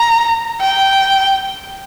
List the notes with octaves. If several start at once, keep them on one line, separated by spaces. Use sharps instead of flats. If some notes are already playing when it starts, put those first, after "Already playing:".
Already playing: A#5
G5